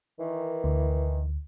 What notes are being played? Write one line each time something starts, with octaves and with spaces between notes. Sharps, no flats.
D#3 E3
D2